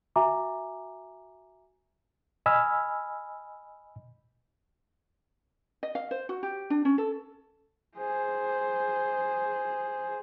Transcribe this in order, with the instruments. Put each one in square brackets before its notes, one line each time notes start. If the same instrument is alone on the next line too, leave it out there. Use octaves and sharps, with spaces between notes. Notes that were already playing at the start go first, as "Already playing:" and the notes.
[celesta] F#4 E5 G#5 A#5 D6
[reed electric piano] D#5 G#5 B5 E6 F6
[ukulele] D#5
F5
C5
F#4
G4
D4
C#4
A4
[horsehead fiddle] G#4 C5